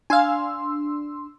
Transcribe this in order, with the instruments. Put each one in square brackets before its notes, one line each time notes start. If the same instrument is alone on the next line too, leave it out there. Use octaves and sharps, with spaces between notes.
[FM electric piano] D4 C6 E6 [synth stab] F5 G#5